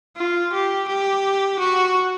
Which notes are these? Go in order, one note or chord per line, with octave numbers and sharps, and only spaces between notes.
F4
G4
G4
F#4